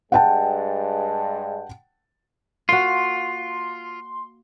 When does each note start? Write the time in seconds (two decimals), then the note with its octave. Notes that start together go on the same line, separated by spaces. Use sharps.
0.12 G2 G#3 F#5 G5 A5
2.69 A#3 F4 F#4 C6